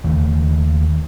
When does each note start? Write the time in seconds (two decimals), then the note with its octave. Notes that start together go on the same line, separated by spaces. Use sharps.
0.04 D#2 D#3 A3